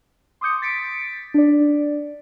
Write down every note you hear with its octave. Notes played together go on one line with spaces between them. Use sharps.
C6 D6 D#6 G6 C#7
A6 B6 C#7 D7
D4 D5